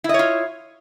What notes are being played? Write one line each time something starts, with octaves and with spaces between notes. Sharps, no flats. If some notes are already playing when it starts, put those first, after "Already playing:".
E4 F4 C#5 D#5